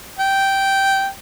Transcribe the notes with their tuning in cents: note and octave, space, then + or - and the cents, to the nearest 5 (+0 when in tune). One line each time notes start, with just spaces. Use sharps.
G5 -10